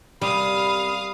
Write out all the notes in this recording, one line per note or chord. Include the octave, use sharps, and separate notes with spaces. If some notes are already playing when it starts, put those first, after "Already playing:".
F#2 C3 G3 F5 B5 D#6